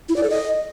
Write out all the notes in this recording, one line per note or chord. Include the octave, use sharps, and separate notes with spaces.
E4
D5
A4
D#5